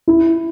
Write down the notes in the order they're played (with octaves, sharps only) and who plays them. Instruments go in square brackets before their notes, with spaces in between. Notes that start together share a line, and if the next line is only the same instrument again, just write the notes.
[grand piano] E4